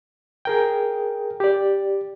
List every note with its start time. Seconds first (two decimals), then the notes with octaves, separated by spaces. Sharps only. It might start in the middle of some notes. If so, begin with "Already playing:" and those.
0.45 G#4 A#4 G5
1.40 G4 D5